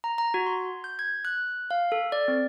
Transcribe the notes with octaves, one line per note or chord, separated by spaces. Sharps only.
A#5
A#5
F#4
C6
G6
G#6
F#6
F5
A4
D5
C4